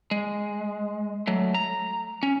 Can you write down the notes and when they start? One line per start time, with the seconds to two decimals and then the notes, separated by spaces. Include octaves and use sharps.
0.11 G#3
1.27 F#3 A3
1.54 A#5
2.23 C#4